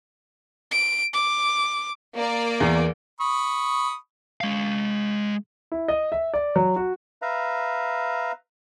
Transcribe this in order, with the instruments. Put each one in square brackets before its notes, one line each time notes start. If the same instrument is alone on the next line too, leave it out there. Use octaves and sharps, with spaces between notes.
[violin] D7
D6
[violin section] A#3 D5
[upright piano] E2
[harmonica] B5 C#6 D#6
[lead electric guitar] G#3 F5
[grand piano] E4
D#5
E5
D5
F#3
F#4
[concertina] B4 E5 F5 A#5